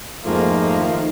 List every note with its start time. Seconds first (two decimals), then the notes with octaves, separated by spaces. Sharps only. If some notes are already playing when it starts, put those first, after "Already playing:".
0.25 F2 G#2 F3 A3 A#3
0.78 D#3